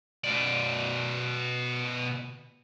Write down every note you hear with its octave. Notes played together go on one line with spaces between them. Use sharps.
B2 D5